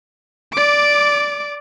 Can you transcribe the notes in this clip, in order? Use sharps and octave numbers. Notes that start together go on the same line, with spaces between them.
D5 D6